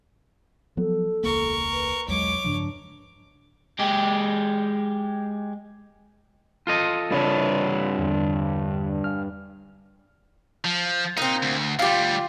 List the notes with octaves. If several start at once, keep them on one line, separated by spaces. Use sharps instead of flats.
F3 F#3 B3 A4
E1 C#2 A#3 A#4 C#6
B4
B1 E2 F#3 G#3 C#5 D6
G2 C#3 F3 D4
G#3 G4
F4 A4 D#5
G2 C#3 D4 C#5 B5 A6
E2 D3
F5 G#5 F6
F3
A#2 C4 D#4
D2
D2 G3 F4 G4